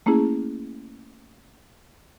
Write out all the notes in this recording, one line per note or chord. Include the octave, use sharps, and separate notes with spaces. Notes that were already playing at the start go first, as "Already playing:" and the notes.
A3 A#3 C#4 E4 G#4